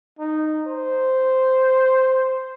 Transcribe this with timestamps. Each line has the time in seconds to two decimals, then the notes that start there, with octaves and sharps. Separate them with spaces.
0.19 D#4
0.66 C5